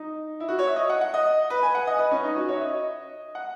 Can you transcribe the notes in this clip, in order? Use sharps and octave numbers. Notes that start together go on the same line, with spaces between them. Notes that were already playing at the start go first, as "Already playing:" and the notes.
Already playing: D#4
E4
F#4
C#5
E5
D#5
F#5
F#5
D#5
B4
G#5
F#5
D#5
B4
C#4
D#4
F#4
C#5
E5
D#5
F#5